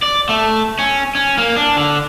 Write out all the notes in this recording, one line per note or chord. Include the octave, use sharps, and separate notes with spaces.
D5
A3
C#4
C#4
A#3
D4
D3